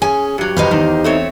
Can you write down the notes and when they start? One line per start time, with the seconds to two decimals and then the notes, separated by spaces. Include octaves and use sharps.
0.02 C#4 G#4 G#5
0.38 G2 F#3 G4
0.57 C#2 D#4 B4 C5 F5
0.71 E2 D#3
1.04 A3 C4 C#5